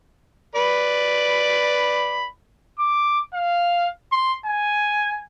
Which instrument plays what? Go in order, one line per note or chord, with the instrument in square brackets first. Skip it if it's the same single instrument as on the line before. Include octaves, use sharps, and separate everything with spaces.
[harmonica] B4 D5 B5
[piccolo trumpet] D6
F5
C6
G#5